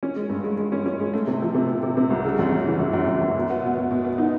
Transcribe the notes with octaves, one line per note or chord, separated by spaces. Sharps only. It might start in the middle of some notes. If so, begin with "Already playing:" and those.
C#4
G#3
G2
G#3
G#3
C#4
C#4
G#3
A3
C3
F3
C3
C3
C3
C3
C2
C#3
F#2
F#2
E3
F#2
F#2
F#2
F#2
B2
B3
B2
B2
B2
B3
D#4